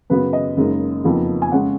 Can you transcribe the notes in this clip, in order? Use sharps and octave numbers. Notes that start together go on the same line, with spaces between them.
F#2 C#3 F#3 B3 B4
D#5
F#1 F#2 C#3 G#3 D#4
F#1 F2 F3 B3 D#4
G#5
C#3 G#3 C#4 F#5